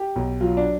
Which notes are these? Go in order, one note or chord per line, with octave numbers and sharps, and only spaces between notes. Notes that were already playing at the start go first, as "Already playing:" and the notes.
Already playing: G4
B1
F#3 F4
D4